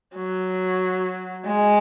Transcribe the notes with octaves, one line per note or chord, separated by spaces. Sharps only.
F#3
G#3